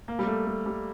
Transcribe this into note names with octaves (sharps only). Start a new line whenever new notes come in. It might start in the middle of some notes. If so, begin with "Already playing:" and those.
A#3
G3
A3
A3
G3